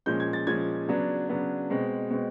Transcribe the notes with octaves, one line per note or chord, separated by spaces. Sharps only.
A#2 F3 G#3 C#4 G6
G#6
A6
A#2 F3 G#3 C#4 G#6
C#3 F#3 B3 D4
C#3 F#3 B3 D4
B2 G#3 C4
B2 G#3 C4